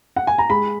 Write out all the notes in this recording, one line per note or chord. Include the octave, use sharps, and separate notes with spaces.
F#5
G#5
A#5
G#3 B5